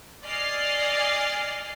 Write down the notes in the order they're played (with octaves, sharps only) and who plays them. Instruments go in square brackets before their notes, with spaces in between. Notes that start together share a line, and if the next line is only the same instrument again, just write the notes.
[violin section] D5 D#5 G#5 F6 A6 C7